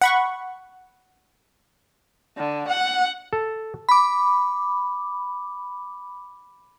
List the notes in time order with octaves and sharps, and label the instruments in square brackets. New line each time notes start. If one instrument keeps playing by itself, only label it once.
[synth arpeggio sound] F#5 B5 C#6
[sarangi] D3
F#5
[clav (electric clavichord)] A4
[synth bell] B5 D6